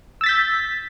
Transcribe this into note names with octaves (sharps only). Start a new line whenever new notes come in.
E6 G6 A6 B6